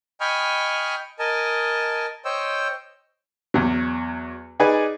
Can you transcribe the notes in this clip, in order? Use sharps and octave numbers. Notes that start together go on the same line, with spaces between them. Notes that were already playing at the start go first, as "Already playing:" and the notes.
D#5 G5 G#5 B5 C#6 F6
A#4 D#5 G#5 A5
C5 C#5 D#5 G5 E6
E2 F#3
D#4 G#4 B4 D5 G#5